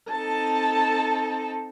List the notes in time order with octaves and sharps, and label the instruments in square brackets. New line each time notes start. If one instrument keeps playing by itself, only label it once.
[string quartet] C4 D#4 A4 [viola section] A5